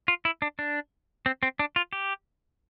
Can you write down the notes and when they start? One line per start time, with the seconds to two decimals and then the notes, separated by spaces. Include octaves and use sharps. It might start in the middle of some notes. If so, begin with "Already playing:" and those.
0.08 F4
0.25 E4
0.42 D4
0.59 D4
1.26 C4
1.43 C4
1.59 D4
1.76 F4
1.93 G4